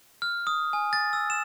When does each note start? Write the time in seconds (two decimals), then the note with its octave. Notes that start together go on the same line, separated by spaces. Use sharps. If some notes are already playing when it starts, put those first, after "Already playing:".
0.22 F6
0.47 D#6
0.73 G#5
0.93 A6
1.13 E6
1.30 E7